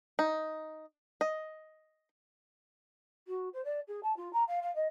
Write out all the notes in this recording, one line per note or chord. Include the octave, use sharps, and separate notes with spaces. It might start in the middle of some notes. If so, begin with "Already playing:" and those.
D#4
D#5
F#4
C5
D5
G#4
A5
F4
A#5
F5
F5
D#5